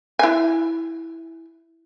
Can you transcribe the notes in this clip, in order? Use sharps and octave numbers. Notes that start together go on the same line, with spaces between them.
E4 G#5